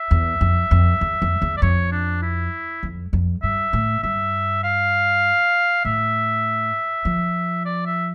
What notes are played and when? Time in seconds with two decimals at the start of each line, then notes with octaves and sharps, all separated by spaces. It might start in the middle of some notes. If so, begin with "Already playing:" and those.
Already playing: E5
0.11 E2
0.41 F2
0.71 F2
1.01 E2
1.22 F2
1.42 E2
1.57 D5
1.62 F2 C#5
1.92 D4
2.22 E4
2.83 F2
3.13 F2
3.43 G2 E5
3.73 A2
4.03 G2 E5
4.64 F5
5.85 A2 E5
7.05 F3
7.65 D5
7.86 E5